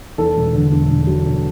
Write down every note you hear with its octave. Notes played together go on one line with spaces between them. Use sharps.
E2 A4
E1
D3
E1
E1
F#3
E1